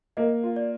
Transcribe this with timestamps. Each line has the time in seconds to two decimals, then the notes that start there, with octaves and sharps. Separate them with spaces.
0.17 A#3 D#5
0.43 F4
0.56 D5